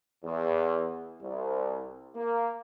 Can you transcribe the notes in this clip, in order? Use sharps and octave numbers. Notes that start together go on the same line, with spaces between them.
E2
C2
A#3